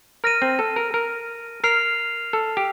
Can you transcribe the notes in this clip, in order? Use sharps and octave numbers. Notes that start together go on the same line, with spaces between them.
A#4 F6 A#6 D#7
C4
A4
A#4
A#4
A#4 F6 C7 F7
A4
G4